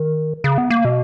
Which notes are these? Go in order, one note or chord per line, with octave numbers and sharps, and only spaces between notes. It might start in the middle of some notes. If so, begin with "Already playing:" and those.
Already playing: D#3
C#3
B3
A#3
B2